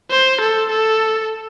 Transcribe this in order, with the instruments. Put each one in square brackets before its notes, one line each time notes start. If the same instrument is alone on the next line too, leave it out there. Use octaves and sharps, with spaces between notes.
[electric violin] C5
A4
A4